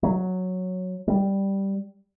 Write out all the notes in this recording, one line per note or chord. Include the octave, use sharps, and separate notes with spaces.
F#3
G3